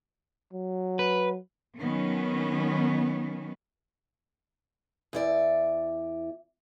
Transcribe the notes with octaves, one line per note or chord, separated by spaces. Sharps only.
F#3
B4
D#3 F#3 B3 C#4
E2 E4 D5